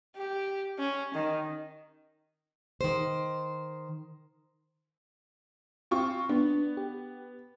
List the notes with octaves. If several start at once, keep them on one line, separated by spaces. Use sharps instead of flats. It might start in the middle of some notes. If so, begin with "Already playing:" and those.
G4
C#4
D#3
D#3 C5
C4 F4 C#6
B3 D4
G4